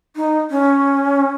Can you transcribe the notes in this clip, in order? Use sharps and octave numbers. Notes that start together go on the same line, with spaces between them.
D#4
C#4